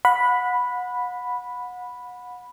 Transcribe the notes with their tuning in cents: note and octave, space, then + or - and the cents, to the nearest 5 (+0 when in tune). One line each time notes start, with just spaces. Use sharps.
F#5 -30 B5 +0